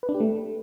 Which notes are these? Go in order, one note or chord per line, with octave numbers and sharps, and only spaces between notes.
B4
D4
G4
A3